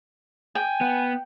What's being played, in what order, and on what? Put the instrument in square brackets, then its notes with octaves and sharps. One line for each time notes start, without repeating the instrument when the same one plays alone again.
[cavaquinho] G5 [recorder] G#5
[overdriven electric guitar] B3